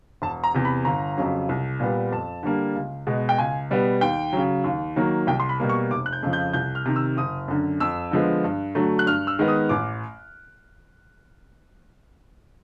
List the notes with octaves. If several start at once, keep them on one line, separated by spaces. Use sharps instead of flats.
E1 A5
A#5
E2 C3
B5
G1 A#5
F2 C#3 F#3
C2
A#2 G3 B3
F2 A5
D3 G3 A#3
C#2
B2 G#3 B3
G5
C#2 G#5
B2 G3 B3
D#2 G5
C#3 F#3
D#2
D#3 F#3 A#3
C2 G5
C6
B5
B2 G3 A#3
C#6
F1 D6
F#6
G6
F2 C#3 F3
G6
C2 G6
F6
C3 D#3
E6
F#1 D#6
F#2 D3
F2 E6
D3 F3 G#3 B3
G2
D3 F#3 A3
F#6
G2 F6
E6
D#3 G#3 B3
D#6
A1 D6